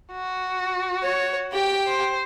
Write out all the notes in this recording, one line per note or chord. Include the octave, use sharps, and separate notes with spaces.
F#4
C#5
G4 G5
C5